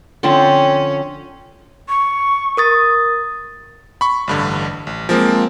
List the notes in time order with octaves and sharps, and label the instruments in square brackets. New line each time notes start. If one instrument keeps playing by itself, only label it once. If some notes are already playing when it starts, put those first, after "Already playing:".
[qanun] D3 F3 C4 [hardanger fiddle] C#4
[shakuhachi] C#6
[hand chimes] A#4 D#6 A6
[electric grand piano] B5 C#6
A1 G2 D3
A1
F3 G#3 A#3 C4